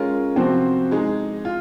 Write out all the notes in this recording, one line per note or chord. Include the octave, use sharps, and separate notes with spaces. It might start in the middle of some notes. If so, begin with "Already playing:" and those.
Already playing: G#3 C#4 F4 A#4
C3 F3 C4 F#4 C5
G#3 D#4 G#4
F4